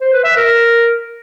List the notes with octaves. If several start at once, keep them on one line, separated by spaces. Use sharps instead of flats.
C5
B4
E5
A#4